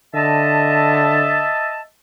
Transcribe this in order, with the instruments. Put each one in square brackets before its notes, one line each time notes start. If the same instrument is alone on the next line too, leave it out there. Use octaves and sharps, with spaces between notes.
[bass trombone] D3 [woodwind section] D#5 E5 A5